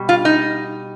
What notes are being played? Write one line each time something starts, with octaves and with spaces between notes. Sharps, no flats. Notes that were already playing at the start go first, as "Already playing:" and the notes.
Already playing: B2 G3
F4
D#4